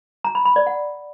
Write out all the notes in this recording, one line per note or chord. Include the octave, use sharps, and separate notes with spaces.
A#5
B5
B5
D5
F#5